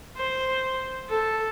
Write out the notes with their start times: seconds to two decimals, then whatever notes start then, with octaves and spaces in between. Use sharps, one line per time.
0.16 C5
1.09 A4